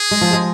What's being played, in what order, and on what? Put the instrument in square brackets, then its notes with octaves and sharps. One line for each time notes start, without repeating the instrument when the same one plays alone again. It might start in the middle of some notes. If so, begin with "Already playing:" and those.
Already playing: [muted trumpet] G#4
[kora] G#3
F3
G#3